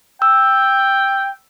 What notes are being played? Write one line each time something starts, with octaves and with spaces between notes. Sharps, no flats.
G5 E6